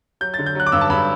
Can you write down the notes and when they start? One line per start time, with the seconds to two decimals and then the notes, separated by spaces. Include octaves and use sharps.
0.21 F#3 G6
0.34 D3 A6
0.46 G6
0.55 F#3 F#6
0.66 D6
0.72 G2 E6
0.81 A5
0.90 G2 B5